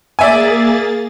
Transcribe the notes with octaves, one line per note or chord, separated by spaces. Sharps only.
A#3 G#4 D5 E5 G#5 A6